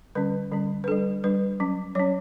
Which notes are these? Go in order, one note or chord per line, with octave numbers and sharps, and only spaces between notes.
D3 G3 C#4 B4
D3 G3 C#4
B4
G3 D4 A4
G3 D4 B4
F#3 C#4
F#3 C#4 C#5